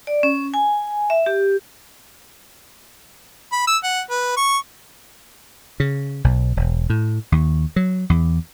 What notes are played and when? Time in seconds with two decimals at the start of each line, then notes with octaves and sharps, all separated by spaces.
0.07 D5
0.23 C#4
0.54 G#5
1.10 E5
1.26 G4
3.52 B5
3.67 E6
3.83 F#5
4.10 B4
4.37 C#6
5.80 C#3
6.24 B1
6.56 E1
6.90 A2
7.32 D#2
7.76 F#3
8.10 E2